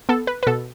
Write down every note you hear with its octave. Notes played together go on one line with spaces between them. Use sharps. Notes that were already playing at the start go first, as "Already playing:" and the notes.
B3 A4
B4
B4
B2 A4